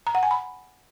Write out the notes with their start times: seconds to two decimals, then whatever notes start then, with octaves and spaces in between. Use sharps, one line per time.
0.07 A#5
0.15 F#5
0.23 G#5
0.31 B5